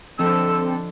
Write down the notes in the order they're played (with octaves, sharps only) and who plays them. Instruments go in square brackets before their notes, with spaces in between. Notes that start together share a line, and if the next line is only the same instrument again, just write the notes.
[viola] D3 A4 [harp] F3 D#5 G6 [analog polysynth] C4 [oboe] E6